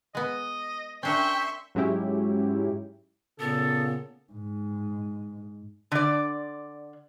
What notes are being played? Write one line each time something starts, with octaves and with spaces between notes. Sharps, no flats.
G#3 B3 D#5
C#4 D4 A#4 E5 G5 C6 C#6
G#2 F#3 G#3 C#4 E4 G4
A#2 C#3 B3 A4
G#2
D3 D5